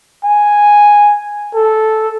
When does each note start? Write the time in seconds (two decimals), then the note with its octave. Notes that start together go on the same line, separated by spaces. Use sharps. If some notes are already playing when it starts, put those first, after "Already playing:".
0.25 G#5
1.55 A4